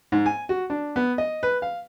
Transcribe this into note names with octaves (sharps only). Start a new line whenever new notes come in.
G#2
G#5
F#4
D4
B3
D#5
B4
F5